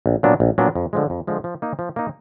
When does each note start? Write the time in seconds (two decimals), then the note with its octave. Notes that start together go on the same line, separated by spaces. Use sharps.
0.06 A#1
0.23 A#2 F#3 B3 D4
0.40 A#1
0.58 A#2 F#3 B3 D4
0.75 F2
0.93 D3 F3 G#3
1.10 F2
1.27 D3 F3 G#3
1.44 F3
1.62 A#3 D#4
1.79 F3
1.96 A#3 D#4